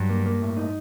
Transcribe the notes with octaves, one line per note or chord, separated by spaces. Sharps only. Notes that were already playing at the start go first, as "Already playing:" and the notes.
Already playing: G2 F#3
A#3
A#3
A2
D#4